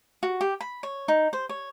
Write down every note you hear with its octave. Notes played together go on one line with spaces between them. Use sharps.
F#4
G4
B5
C#5
D#4
C5
C#5